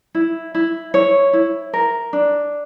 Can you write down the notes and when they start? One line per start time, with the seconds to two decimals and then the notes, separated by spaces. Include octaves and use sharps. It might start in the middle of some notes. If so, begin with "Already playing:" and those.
0.15 E4
0.55 E4
0.94 E4 C#5
1.33 E4
1.73 A#4
2.13 D4